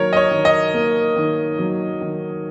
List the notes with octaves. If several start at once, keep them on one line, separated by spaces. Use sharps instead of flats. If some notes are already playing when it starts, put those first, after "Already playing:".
Already playing: D#3 F#3 A#3 A#4 C#5
D#5
C#5
D#3
D#5
A#3
D#3
F#3
D#3